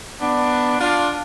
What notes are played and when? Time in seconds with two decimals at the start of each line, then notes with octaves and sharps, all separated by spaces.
0.21 B3 D4
0.79 D4 F4